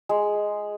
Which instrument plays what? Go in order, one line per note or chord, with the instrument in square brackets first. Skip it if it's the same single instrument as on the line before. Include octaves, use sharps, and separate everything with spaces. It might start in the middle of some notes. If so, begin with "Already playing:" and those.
[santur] G#3